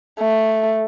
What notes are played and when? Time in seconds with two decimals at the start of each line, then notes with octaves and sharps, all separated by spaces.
0.20 A3